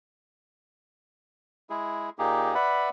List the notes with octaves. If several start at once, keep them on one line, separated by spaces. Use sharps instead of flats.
G#3 E4 G#4
A#2 A#3 D#4 G4 G#4
B4 D5 E5 F#5 B5